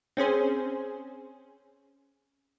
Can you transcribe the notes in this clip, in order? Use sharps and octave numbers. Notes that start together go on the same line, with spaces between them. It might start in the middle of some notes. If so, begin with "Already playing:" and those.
C4 C#4 G#4 C5